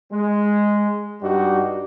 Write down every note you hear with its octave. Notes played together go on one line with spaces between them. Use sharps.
G#3
G2 G3 D#4 F#4 G4